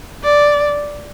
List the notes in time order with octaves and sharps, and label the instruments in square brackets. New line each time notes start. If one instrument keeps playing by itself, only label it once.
[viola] D5